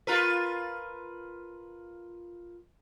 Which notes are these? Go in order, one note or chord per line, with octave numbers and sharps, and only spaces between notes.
F4 A#4 B4